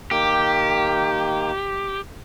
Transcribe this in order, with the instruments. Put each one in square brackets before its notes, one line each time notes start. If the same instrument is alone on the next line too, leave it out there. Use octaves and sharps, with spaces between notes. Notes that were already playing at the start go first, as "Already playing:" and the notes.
[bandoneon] D#3 A#3 [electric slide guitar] G4